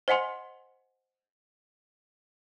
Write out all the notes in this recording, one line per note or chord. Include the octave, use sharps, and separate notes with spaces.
C5 D#5 F#5 G#5 C6